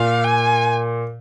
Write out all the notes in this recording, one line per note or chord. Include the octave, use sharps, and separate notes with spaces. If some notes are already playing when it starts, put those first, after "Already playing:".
Already playing: A#2 F5
G#5